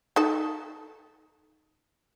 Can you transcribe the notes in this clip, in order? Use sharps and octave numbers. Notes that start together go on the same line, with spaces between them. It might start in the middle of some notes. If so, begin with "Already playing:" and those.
D#4 A4 A5